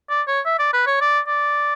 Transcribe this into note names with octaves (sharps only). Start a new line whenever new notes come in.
D5
C#5
E5
D5
B4
C#5
D5
D5